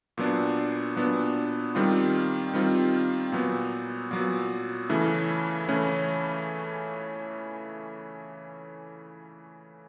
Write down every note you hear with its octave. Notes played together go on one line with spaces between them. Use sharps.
A#2 F#3 B3 D4
A#2 F#3 B3 D4
D#3 G3 C4 F4
D#3 G3 C4 F4
A#2 F#3 B3
A#2 F#3 B3
C#3 E3 A3 C#4 E4
C#3 E3 A3 C#4 E4